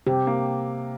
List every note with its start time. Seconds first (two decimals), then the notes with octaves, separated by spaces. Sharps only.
0.07 C3 G4
0.27 A#3